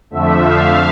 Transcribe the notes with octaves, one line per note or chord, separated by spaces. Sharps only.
F2 D3 F3 A3 E5
F5